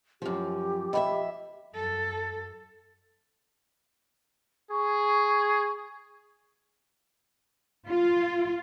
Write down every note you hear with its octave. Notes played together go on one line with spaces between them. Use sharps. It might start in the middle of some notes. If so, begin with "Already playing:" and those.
F#2 F3 G4
F2 F#4 D#5 E5 G5 B5
F#2 A4
G#4 C#6
F4